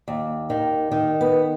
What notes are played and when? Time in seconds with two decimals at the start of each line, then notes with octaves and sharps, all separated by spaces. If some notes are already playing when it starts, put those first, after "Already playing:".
0.08 D#2
0.50 D#3
0.92 D#3
1.21 B3